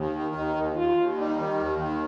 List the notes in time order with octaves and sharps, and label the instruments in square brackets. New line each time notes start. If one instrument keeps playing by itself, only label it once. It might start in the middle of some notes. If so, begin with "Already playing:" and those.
Already playing: [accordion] D#2
D#3
[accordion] D#2 [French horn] D#4
[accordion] D#2
[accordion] D#2 [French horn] F4
[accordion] D#2
[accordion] G3 [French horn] D#4
[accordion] D#3
D#2
D#3